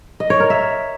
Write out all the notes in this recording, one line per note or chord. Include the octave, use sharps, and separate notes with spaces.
D#5
C#5
A#4
E5